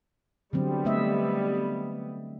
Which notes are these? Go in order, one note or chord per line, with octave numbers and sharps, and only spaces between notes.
D3 F#3 G3 B3 C4
A3 D#5 E5